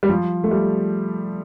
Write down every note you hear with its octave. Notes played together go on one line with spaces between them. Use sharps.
G3
F3
A3
G3